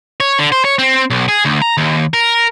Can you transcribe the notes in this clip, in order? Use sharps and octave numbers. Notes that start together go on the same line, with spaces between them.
C#5
D3
C5
C#5
C4
B1
G#4
D2
A#5
D#2
A#4